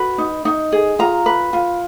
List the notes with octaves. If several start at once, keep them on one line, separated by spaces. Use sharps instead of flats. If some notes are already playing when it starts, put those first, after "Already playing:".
Already playing: F#4 B4
D#4
D#4
G#4
F4 A#5
B4
F4